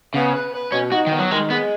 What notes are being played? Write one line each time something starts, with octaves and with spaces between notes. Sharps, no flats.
C#3 B3
B4
B4
B2 C#4
D#4 F#4
D#3 B3
F#3
D#3 G#3
G#3 B3